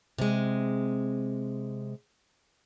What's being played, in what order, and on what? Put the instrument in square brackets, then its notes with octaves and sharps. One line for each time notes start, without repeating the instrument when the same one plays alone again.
[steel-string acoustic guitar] C3 G#3